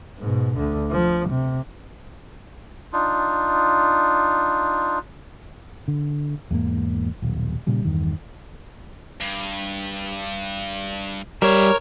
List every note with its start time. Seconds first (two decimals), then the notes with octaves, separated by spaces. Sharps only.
0.19 G#2 B2
0.57 D2 D3
0.91 F3
1.29 C3
2.93 D4 D#4 F4
5.88 D3
6.51 E2 G#2 A#3
7.22 D#1 B1
7.67 A#2 C#3 G3
7.85 E2 G2 D#3
9.20 G2
11.42 G3 G#4 A#4 C#5 E5